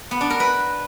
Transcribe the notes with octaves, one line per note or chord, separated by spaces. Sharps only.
B3
D4
A#4
B4